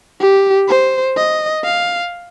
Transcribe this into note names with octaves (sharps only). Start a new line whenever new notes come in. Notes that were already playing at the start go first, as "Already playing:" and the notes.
G4
C5
D#5
F5